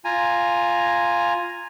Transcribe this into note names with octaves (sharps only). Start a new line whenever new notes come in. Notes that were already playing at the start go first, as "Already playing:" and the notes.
F4 G#5 A#5